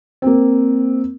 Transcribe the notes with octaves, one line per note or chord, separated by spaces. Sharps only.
A#3 C4